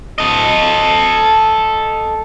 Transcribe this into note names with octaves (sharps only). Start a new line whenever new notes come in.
A4 D#5